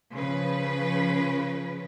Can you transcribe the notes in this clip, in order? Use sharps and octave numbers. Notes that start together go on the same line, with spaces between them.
C#3 F3 B4